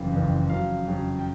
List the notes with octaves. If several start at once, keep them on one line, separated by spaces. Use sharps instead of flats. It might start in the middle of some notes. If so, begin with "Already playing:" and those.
Already playing: F#1 F2 C#3 E3 F5
F#1 F2 C#3 E3
F2 C#3 F#3 F5
F2 C#3 F#3
G5